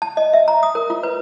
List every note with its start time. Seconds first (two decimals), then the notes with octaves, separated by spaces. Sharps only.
0.02 A5
0.17 D#5
0.33 E5
0.48 A#5
0.63 D#6
0.75 A#4
0.90 F4
1.03 B4